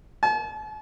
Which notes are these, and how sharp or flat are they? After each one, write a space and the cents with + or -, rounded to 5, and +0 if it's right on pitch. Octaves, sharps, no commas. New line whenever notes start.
A5 -45